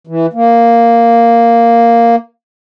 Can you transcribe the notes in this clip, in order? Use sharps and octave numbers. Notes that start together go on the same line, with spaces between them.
E3
A#3